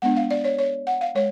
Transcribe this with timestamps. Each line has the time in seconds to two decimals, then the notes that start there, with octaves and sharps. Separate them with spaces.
0.02 G#3 B3 D4 F#5
0.16 F5
0.31 D5
0.44 C#5
0.59 C#5
0.87 F#5
1.01 F5
1.15 G#3 C#5